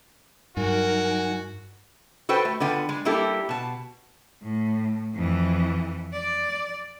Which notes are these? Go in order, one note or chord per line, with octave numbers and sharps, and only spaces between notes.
G2 F#3 D#4 F#4 A#4 G#5
F#4 A4 B4 C5 G5
A3
D3 B3 F4 G5
G#3
G3 A#3 E4 G4 A4
B2 A5
A2
F2 E3
D5